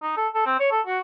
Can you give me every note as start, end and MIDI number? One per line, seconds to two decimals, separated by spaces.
0.02 0.17 63
0.17 0.28 69
0.34 0.43 69
0.46 0.55 60
0.59 0.70 73
0.71 0.81 69
0.87 1.00 66